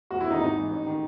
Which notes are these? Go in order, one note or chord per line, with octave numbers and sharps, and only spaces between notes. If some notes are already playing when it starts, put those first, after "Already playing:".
E1 F#4
E4
E2 D#3 D#4
G#1 D#4
G#2 E3
A1
D#3